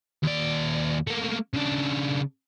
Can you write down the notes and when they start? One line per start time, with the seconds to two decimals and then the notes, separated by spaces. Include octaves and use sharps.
0.23 D#2 D5
1.07 A3 A#3
1.53 C#3 D4